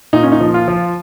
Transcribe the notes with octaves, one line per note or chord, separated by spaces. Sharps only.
A#2 D#4
C#4
D#4
F3
F4
F3